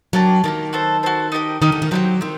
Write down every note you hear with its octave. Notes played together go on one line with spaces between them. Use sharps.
F#3 A#3 D4 G4
D#3 A#3 D4 G4
F#4 A4 C5
F#4 A4 C5
D#4 G4 A#4 D#5
D#3 D#4 G4 A#4 D#5
D3
D#3
F#3 C4 D#4 G4
D#3 C4